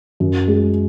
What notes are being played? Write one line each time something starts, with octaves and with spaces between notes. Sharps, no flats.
F#2
G#3